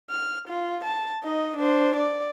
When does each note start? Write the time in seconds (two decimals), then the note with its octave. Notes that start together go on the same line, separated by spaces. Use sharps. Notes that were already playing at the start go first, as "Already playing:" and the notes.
0.11 F6
0.48 F4
0.84 A5
1.23 D#4 D#5
1.57 D4 C5
1.97 D5